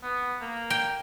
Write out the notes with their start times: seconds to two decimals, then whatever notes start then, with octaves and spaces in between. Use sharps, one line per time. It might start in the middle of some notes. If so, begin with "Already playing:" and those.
0.03 B3
0.41 A#3
0.70 G5